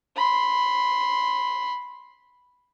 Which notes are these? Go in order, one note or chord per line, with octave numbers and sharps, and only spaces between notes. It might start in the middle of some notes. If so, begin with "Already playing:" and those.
B5 C6